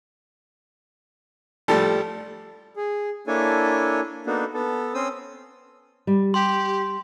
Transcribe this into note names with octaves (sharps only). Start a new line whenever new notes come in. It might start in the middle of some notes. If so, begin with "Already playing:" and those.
A2 F3 G3 A4
G#4
A#3 D4 E4 A4 C#5 G#5
A#3 B3 D4 D#4 F#4 A4
B3 A4
C4 C#4 C5 D#6 E6
G3
G4 C6